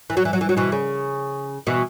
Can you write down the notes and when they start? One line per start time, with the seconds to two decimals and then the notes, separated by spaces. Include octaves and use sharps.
0.10 E3
0.17 F#3
0.25 E3
0.33 F#3
0.41 E3
0.49 F#3
0.57 B2 E3
0.72 C#3
1.67 B2 E3